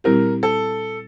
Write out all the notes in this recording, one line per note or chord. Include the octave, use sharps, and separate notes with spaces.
A#2 G3 C4 E4 G4 A#4
A4